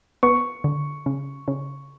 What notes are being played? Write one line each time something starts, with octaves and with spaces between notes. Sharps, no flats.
B3 C#6
D3
C#3
C#3